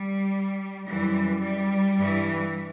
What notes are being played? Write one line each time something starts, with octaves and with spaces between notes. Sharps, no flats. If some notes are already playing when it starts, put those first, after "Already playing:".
Already playing: G3
F#2 E3 G3
G3
G2 E3